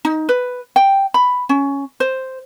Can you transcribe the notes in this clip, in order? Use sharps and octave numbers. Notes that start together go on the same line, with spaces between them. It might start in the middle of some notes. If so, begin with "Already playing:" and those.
D#4
B4
G5
B5
C#4
C5